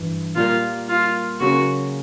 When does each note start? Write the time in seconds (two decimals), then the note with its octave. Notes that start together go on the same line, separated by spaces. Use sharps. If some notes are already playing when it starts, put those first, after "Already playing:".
Already playing: G2 E3
0.35 A#2 G3 A#3 F4
0.89 F4
1.40 C#3 F#3 A#3 C#4 F#4